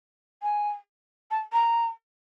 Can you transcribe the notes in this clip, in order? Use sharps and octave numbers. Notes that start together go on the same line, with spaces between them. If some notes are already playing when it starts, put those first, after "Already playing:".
G#5
A5
A#5